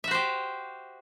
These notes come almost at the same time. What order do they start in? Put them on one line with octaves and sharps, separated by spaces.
E5 F#4 C5 G4